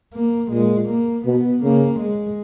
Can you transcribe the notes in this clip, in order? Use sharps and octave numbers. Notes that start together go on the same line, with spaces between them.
A#3
A#2 G#3
A#3
B2 B3
C#3 A#3
G#3